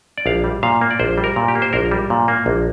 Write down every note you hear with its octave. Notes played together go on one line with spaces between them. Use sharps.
D5
A#1 F5
G3
A#2 F5
A#3
D5
A#1 C5
G3
A#4
A#2
G4
A#3
C5
A#1 A#4
G3
A#2
A#3
A#1